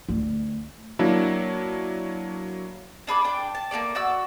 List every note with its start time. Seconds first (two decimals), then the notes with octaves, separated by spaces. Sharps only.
0.09 D2
0.99 F#3 A#3 D4 E4
3.07 D4 G#4 B5 D6
3.24 D4 G5
3.55 A5
3.71 A#3 B3 A4 D5
3.95 F#4 D5 E6